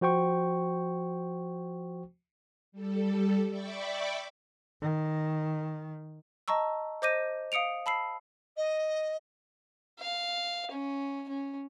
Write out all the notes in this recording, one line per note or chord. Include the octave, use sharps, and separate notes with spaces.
F3 F#4 C5 G5 C#6
G3 A4
D5 E5 G5 B5 C#6 D6
D#3
D#5 A5 A#5 C#6 E6
C5 D#5 D6 G6 A#6 D#7
F5 D#6 C#7 D7 F7
A5 B5 E6 C7
D#5
F5
C#4
C#4